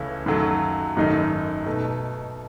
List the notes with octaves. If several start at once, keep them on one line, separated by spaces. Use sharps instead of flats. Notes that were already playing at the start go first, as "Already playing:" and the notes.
Already playing: C#2 C#3 E3 A3 C#4
F#2 D#3 F#3 A3
G#1 F#2 D#3 A3 D#4
B2 A3 D#4